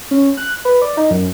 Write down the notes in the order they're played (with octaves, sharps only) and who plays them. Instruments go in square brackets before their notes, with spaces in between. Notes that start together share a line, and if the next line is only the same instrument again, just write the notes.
[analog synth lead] C#4
F#6
B4
D5
D#4
F#2